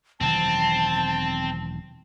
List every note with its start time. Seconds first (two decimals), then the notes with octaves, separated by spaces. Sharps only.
0.21 E1 D#3 F#3 C4 A5